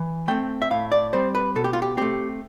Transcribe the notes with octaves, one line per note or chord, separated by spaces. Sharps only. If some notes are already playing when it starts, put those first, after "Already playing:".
Already playing: E3
A3 C4 G5
E5
A2 F5
D5
G3 C4 C5
B4
B2 A4
G4
F4
G4
A3 C4 G4